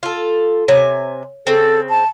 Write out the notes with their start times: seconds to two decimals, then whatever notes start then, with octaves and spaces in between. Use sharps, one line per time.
0.03 F4 A4
0.68 C3 C#5 G#5
1.47 C#3 C4 A4
1.89 A5